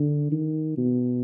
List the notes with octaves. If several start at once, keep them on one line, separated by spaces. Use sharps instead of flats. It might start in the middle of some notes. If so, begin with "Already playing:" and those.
Already playing: D3
D#3
B2